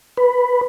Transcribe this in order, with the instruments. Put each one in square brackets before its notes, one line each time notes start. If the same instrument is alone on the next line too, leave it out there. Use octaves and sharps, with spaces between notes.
[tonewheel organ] B4